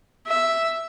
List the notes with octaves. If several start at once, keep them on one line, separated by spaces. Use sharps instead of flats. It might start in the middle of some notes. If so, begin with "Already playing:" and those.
E5